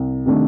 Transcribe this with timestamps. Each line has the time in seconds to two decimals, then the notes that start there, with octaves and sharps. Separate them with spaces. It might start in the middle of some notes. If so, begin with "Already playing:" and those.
Already playing: C2
0.26 C3 D#3 A3 D4